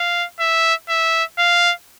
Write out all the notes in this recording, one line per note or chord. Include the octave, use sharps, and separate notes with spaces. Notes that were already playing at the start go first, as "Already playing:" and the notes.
Already playing: F5
E5
E5
F5